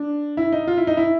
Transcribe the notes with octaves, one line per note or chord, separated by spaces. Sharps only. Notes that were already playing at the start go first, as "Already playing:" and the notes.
Already playing: D4
E4
D#4
F4
E4
D#4
E4